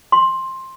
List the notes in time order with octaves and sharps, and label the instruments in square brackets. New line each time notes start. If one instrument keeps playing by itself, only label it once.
[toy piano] C6